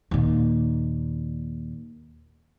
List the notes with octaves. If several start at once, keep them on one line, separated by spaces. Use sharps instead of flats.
D#2 A#2